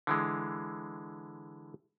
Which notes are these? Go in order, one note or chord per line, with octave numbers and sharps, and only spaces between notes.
D3 E3 G#3